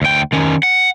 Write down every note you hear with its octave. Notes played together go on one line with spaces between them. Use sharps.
D2 G5
D#3 C#4
F#5